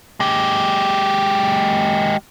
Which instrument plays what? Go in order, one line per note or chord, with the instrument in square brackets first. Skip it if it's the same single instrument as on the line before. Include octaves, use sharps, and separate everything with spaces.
[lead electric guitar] G#3 G4